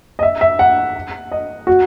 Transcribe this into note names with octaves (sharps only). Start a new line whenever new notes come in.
D#5
E5
E5
F#5
D#5
F#4